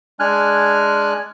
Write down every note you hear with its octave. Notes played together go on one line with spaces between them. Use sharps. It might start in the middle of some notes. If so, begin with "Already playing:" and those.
G#3 D4 G#5 F6 F#6